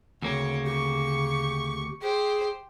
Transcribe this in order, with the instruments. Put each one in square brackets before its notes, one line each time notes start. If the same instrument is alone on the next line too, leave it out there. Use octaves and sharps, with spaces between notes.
[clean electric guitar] D2 A#3 C4 [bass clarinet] C#3 [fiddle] C#5
[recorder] G4 [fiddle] C#6
[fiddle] G4 C5 [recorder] G#4